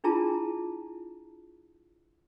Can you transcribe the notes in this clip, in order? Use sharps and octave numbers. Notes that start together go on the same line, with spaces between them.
D4 E4 F4 G#4 A5 A#5